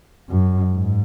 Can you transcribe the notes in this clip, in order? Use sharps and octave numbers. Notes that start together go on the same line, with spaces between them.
F#2
G#2